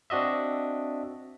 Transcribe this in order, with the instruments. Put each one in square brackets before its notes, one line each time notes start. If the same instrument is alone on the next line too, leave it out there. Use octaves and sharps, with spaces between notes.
[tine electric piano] C4 D4 F#4 D#5 E5